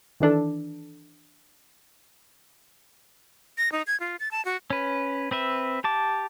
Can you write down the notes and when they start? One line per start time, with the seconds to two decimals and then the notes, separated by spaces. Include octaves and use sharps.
0.20 D#3 E3 D4 A4
3.58 A#6
3.72 D#4
3.87 G#6
4.00 F4
4.20 A6
4.31 A5
4.45 F#4
4.70 C#4 B4
5.31 C4 B4 E5
5.84 G4 A5 D6